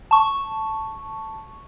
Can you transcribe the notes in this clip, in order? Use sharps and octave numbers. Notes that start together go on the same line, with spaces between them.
A5 C#6